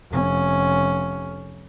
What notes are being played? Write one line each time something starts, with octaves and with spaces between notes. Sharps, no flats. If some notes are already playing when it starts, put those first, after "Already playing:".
F1 C#4